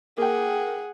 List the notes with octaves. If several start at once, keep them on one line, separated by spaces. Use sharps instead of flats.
A#3 G#4 F#5 G5